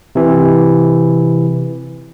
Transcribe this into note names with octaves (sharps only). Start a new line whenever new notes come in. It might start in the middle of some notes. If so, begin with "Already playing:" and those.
C3 E3